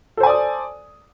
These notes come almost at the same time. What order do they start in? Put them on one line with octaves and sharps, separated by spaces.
A4 C5 G#5 D5 D#6